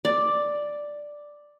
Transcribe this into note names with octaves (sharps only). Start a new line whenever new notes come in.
D5